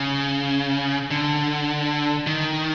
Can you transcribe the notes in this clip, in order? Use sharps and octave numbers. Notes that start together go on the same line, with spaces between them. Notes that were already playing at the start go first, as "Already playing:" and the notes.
Already playing: C#3
D3
D#3